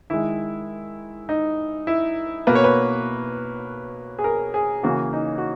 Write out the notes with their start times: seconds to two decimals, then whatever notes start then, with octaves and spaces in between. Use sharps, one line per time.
0.10 D#3 G#3 E4
1.29 D#4
1.87 E4
2.47 B2 A#3 B4
2.55 C#5
2.64 B4
4.19 G#4
4.24 A#4
4.54 G#4
4.83 C#3 E3 A#3 F#4
5.13 D#4
5.38 F#4